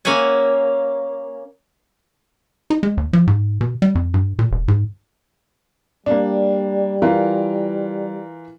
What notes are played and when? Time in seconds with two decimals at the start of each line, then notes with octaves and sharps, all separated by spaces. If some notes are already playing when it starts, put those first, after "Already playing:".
0.05 A#3 C#4 E5 F#5 G#5
2.70 D#4
2.83 G#3
2.97 D#2
3.13 F3
3.27 G#2
3.61 B2
3.82 G3
3.95 F2
4.14 G2
4.39 A#2
4.51 E1
4.68 G#2
6.06 G3 A#3 D4
7.02 E3 F4 A#4